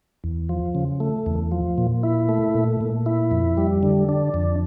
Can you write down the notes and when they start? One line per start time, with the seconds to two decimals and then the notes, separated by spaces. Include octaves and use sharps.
0.24 E2
0.49 F3
0.75 C#3
1.00 A3
1.26 E2
1.52 F3
1.78 A#2
2.03 E4
2.29 A3
2.55 A#2
2.81 A#2
3.06 E4
3.31 F2
3.57 G3
3.83 D3
4.09 D4
4.34 F2